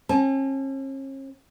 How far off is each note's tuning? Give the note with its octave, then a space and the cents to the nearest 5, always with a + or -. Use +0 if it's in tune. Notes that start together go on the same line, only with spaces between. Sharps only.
C#4 -45 A5 -30